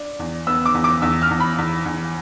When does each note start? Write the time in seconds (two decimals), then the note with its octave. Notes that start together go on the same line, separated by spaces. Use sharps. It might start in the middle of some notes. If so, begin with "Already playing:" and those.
Already playing: D4
0.19 E2
0.47 B3 E6
0.66 D6
0.74 E2
0.84 D6
1.02 E2 E6
1.22 F6
1.31 E2
1.40 B5
1.58 E2
1.86 E2